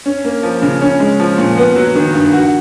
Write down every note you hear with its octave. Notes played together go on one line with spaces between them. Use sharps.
C#4
A#3
F3
C#3
C#4
G#3
F3
A#2
B3
F#3
D#3
G2
F#4